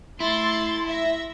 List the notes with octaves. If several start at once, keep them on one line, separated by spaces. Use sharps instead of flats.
A3 E4 C6 A6
E5 A#6